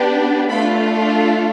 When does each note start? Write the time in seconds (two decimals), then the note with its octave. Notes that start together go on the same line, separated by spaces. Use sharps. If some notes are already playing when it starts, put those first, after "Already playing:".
Already playing: B3 D4 G4
0.49 A3 D4 F4 A4 B5